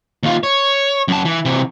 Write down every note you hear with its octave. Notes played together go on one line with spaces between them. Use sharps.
D#2 F4
C#5
F#2 A5
E3
C3 E3